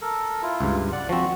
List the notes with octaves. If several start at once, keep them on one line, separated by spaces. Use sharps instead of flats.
A4 A#4
E4 F4
C#2 G2
D5 F#5
F3 C4 F#4